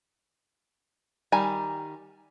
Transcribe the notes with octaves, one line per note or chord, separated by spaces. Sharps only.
D#3 G3 G#5 A#5